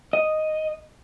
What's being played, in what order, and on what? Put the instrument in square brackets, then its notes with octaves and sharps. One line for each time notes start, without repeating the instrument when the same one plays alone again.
[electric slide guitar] D#5